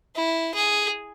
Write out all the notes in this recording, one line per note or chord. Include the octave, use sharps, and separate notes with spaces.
E4
G#4